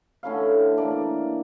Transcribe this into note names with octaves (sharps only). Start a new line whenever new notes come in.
D3 A3 C#4 E4 F5
E3 A#3 D4 D5